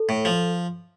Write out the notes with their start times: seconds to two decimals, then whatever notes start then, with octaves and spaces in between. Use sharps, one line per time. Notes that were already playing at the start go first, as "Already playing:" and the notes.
Already playing: A4
0.09 A2
0.25 F3